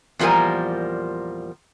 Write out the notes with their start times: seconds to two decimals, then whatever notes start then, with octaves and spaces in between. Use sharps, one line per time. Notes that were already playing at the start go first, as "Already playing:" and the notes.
0.19 E2 A#2 F3 G3 A#4 G#5